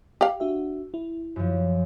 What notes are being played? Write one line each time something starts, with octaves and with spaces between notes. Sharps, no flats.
G4 F5
D4 F#4 E5
E4
F#2 F3